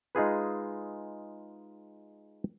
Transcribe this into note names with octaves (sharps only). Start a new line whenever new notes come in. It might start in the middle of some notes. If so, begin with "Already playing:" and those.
G#3 D#4 F4 G#4 B4